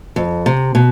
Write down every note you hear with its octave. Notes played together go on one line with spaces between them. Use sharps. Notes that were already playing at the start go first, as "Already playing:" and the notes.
F2
C3
B2